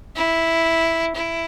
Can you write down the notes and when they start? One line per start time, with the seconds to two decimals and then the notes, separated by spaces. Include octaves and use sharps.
0.15 E4
1.15 E4